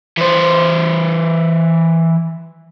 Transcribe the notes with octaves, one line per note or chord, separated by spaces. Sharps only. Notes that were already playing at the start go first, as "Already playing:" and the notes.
E3 C5